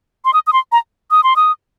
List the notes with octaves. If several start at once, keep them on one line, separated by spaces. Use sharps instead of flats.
C6
D#6
D#6
C6
A#5
D#6
C6
D#6